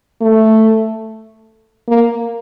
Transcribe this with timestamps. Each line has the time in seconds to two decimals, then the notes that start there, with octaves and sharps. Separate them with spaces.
0.21 A3
1.88 A#3